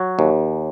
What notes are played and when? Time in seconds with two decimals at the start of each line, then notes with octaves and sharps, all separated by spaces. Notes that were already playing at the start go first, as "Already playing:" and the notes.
Already playing: F#3
0.19 D#2